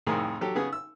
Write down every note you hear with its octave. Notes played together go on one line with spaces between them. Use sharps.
C2 F2 A2 D#3 G#4 A#4
F#3 G4 A4
C#3 B3 G#4
E6